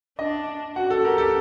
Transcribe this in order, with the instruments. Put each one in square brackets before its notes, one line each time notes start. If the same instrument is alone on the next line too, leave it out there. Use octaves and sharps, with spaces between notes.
[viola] D4 [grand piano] D#5
[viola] F#4 [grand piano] F#5
[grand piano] A4
[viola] G4 [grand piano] A#4
[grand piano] A4